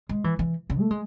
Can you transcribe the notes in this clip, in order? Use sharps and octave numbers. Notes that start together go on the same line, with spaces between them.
G#3
E3
E3
C#3
A3
G#3